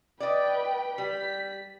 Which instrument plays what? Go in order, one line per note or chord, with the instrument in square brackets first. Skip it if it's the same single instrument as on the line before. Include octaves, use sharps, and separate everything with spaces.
[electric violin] B4 G5 [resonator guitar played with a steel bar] D5 D#5
[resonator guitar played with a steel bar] G3 [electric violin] B6